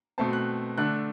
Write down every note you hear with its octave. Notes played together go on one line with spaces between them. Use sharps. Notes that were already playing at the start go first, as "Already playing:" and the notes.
B2 A3 C4 A5
F#6
D3 A3 D4 F#6